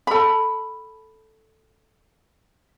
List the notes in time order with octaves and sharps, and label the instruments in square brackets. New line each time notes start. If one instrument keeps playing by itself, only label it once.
[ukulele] A4 B5